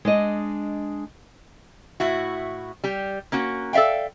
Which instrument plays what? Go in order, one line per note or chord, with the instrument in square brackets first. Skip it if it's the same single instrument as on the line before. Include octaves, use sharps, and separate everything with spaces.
[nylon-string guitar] G#3 D4 D#5
[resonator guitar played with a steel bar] A2 E4 F#4
G3 G4
A#3 C#4 F#4
A4 D5 E5 F5 G5